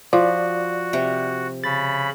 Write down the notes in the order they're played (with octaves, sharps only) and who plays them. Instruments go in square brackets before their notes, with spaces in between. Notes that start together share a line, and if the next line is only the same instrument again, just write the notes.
[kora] F3 [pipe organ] F#4 [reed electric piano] D5
[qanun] C3
[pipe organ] C#3 B5 [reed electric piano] A6